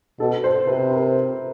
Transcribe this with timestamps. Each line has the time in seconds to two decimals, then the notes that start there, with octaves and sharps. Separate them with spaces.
0.20 B2 A4
0.44 C5
0.67 C3 B4
0.90 A#4